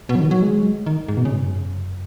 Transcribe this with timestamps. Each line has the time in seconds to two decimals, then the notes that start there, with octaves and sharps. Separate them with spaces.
0.09 B2
0.15 F#3
0.20 D#3
0.31 F#3
0.42 G#3
0.86 D#3
1.08 G#2
1.17 B2
1.25 C#3
1.34 G#2
1.42 F#2